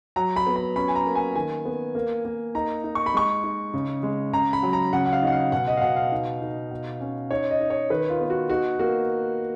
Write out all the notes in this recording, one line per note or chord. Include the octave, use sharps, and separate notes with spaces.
F#3 A#5
B5
B3
B5
C#4 B5
G#5
A#5
A#3
G#5
D#3 G#5
B3
A#3
A#3
D#4 A#5
D#4
C#6
B5
G#3 C#6
D#4
C#3
G#3
C#3 A#5
B5
F#3
A#5
C#3 F#5
F#5
F5
D#4 F#5
F5
B2 F#5
D#5
F5
B2 F#5
F5
D#4
D#4
B2
C#4
D#4 C#5
D#5
D#4
C#5
D#3 B4
F4
B3
F#4
D#4 F#4
A#3 F#4